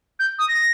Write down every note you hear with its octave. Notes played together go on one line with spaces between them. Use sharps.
G6
D#6
A#6